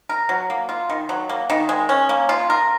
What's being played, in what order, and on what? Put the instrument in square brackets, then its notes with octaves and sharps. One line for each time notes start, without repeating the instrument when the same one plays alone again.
[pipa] A#4
F#3
A#3
F4
D#3
F#3
A#3
D#3
G#3
C#4
A#3
F4
A#4